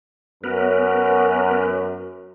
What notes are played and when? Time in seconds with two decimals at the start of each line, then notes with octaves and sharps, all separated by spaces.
0.44 F#2 B3 A#4 B4